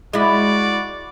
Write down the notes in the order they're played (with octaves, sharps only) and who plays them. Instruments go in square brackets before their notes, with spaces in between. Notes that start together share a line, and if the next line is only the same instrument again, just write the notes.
[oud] G#3 E4 [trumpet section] F#4 D5